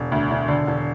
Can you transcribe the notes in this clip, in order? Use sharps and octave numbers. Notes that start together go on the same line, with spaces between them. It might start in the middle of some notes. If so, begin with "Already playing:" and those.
Already playing: E1
D2
E1
D3
E1